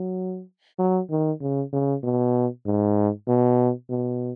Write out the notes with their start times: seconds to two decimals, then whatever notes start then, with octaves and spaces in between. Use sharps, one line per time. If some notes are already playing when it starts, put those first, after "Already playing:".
Already playing: F#3
0.79 F#3
1.10 D#3
1.41 C#3
1.73 C#3
2.03 B2
2.66 G#2
3.28 B2
3.90 B2